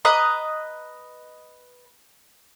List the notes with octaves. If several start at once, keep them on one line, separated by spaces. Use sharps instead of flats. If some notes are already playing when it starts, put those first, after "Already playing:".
B4 D#5 A#5